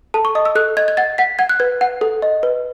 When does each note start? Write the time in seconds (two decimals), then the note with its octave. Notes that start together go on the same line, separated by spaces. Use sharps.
0.14 A4 A5
0.25 C#6
0.35 D#5 D#6
0.45 E6
0.55 A4 F#6
0.77 D#5 G#6
0.88 G#6
0.97 F#5 A6
1.18 F#5 B6
1.39 F#5 G#6
1.49 F#6
1.60 B4 G#6
1.81 F#5
2.01 A4
2.22 D#5
2.43 B4